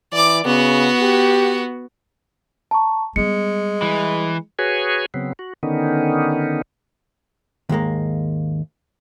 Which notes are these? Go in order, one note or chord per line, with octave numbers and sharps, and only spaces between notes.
E3 D5 D6
C#3 B3 F#4
G4
A5 A#5 C#6
G3 G#3 B3 C#7
E3
F#4 G#4 B4 C#5 G#5
C#3 F#3 B3 C4
F#4
D3 D#3 B3 C#4 D#4
D#2 G#2 G#3 A#3